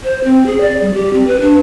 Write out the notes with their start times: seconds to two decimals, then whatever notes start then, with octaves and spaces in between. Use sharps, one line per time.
0.04 C5
0.24 C4
0.46 G#4
0.61 D5
0.81 G3
0.94 G4
1.13 C4
1.27 B4
1.41 D4